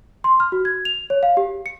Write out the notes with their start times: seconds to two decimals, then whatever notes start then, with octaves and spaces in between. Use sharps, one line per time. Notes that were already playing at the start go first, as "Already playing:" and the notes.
0.24 C6
0.40 F6
0.52 F#4
0.65 G#6
0.85 F7
1.10 C#5
1.23 F5
1.37 G4
1.66 C#7